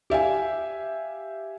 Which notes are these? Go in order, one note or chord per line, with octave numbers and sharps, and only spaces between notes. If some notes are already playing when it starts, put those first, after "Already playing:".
G4 E5 F5 G#5